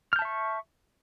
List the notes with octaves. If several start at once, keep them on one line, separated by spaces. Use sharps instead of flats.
E5 A5 C#6 F6 G6